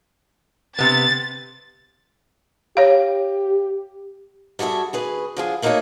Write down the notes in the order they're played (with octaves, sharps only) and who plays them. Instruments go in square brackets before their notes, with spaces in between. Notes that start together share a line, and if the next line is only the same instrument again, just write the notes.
[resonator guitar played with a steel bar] C3 B3 [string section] A6
[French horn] G4 [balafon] C#5 F5
[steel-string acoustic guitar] G3 F#4 G#4 A4 E5
D2 G#4 B4
D3 F3 G#4
A3 A#3 D#4 E4 F#4 C#5